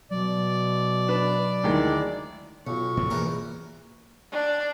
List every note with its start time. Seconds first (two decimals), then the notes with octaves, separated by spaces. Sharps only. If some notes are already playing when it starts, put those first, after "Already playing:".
0.11 B2 F#3 D5
1.08 D4 B4
1.64 D2 D#3 G#3 E4
2.67 B1 B2 F4 C#6
2.97 A#2 C#3 A3
3.10 A1 E2 A#3 A#4
4.32 D4